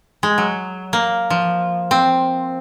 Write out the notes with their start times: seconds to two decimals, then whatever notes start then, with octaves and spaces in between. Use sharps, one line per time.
0.23 G#3
0.38 F#3
0.93 A#3
1.30 F3
1.91 C4